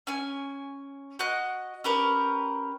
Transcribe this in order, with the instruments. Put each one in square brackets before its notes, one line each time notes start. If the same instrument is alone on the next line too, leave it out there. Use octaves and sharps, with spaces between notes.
[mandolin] C#4 G#5
F#4 D#5 F#6
C#4 G4 A#4 B4